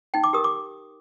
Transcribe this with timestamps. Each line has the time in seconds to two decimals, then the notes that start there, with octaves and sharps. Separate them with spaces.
0.14 D#4 G5
0.24 D6
0.33 G4 A#4 D#6
0.44 D6